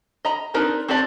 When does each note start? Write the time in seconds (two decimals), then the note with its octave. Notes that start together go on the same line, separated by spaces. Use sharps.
0.25 D#5 A#5 B5
0.54 C4 D4 D#4 A#4 B4
0.88 C4 F#4 G4 D5 A5